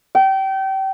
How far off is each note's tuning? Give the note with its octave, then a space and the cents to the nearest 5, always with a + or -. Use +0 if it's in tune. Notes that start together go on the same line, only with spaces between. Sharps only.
G5 -30